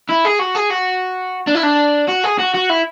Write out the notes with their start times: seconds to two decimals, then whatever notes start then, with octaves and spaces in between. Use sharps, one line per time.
0.09 E4
0.25 G#4
0.39 F#4
0.55 G#4
0.70 F#4
1.47 D4
1.55 E4
1.63 D4
2.08 F#4
2.24 G#4
2.39 F#4
2.54 F#4
2.69 E4